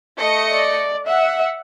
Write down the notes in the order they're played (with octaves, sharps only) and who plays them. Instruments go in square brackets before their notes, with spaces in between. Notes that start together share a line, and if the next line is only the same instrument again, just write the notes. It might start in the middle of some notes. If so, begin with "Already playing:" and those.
[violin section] A3 D#5 C#7
[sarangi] D5
[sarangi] E5 [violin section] F#5